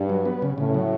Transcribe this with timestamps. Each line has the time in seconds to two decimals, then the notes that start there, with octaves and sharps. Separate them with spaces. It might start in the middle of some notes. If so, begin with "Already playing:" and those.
Already playing: G2
0.09 F#3
0.25 B3
0.42 C#3
0.58 A2 C#3
0.74 F#3